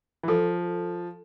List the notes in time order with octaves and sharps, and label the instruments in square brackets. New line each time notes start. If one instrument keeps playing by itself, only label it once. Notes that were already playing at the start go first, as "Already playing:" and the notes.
[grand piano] E3
[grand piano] F3 [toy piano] A4